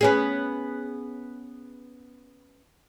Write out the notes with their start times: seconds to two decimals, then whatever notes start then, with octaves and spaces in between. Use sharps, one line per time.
0.01 B3 C#4 G#4